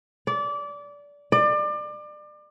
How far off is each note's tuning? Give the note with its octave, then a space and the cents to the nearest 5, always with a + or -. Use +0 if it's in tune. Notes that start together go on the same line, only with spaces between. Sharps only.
D5 -20
D5 +30